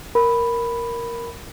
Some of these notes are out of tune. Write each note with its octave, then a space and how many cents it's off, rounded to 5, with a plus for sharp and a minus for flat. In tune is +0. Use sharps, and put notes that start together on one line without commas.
A#4 +0 B5 +0